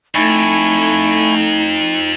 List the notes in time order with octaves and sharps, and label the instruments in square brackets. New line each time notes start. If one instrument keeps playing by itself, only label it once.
[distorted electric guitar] F2 [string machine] A3 A#5 [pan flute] D#4 [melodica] E4 G#5 C#6